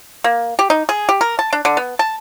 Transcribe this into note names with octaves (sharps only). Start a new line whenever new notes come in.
A#3
G4
D#4
G#4
G4
A#4
A5
D4
D3
B3
A5